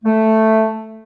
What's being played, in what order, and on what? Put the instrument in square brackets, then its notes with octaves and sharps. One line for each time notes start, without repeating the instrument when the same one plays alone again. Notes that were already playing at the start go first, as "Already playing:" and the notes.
[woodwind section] A3